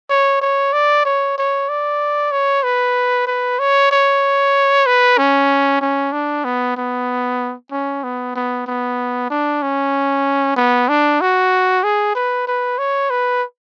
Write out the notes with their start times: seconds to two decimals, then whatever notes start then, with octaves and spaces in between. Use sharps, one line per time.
0.10 C#5
0.42 C#5
0.73 D5
1.06 C#5
1.38 C#5
1.69 D5
2.32 C#5
2.64 B4
3.27 B4
3.59 C#5
3.91 C#5
4.86 B4
5.18 C#4
5.81 C#4
6.13 D4
6.45 B3
6.77 B3
7.71 C#4
8.04 B3
8.36 B3
8.66 B3
9.30 D4
9.62 C#4
10.56 B3
10.89 D4
11.21 F#4
11.84 G#4
12.15 B4
12.47 B4
12.78 C#5
13.10 B4